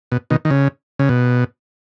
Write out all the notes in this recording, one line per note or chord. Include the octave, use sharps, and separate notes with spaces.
B2
B2 D#3
D#3
C#3
C#3
B2